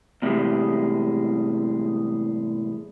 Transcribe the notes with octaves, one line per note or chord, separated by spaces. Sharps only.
E2 A2 C3 G3 G#3